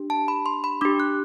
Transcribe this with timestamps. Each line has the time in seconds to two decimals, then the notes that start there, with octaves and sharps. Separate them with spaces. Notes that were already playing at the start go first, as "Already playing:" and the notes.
Already playing: D4 G4
0.10 A5
0.28 B5
0.46 C6
0.64 B5
0.81 D4 G4 D6
1.00 F#6